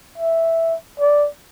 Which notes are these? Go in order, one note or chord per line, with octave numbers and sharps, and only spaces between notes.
E5
D5